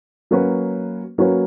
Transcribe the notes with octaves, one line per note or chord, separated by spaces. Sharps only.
F#3 A#3 C#4 F#4 B4
F#3 A#3 C#4 F#4 B4